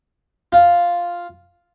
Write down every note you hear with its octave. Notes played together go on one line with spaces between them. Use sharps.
F4